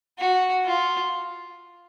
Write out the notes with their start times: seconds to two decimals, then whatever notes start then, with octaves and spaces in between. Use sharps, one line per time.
0.19 F#4
0.65 F4